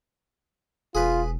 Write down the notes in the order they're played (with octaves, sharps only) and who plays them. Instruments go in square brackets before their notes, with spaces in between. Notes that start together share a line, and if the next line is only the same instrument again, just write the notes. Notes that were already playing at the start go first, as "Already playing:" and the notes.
[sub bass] E1 [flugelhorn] F4 [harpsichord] G#4 B4